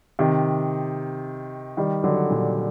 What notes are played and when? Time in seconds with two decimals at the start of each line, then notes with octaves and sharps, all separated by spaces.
0.19 C3 D#3
1.77 D#3 G3
2.04 D3 F#3
2.31 A#2